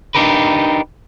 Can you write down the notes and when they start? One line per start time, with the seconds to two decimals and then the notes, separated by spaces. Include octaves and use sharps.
0.15 D4 D#4 G4 A#4 B4